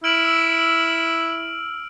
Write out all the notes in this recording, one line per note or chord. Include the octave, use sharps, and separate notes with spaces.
E4 F6 D7 F#7
E6